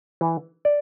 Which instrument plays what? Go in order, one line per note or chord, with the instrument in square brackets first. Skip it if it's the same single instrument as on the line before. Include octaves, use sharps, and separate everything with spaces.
[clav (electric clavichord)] E3
D5